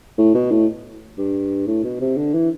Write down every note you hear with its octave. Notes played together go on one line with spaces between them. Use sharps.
A2
B2
A2
G2
A2
B2
C3
D3
E3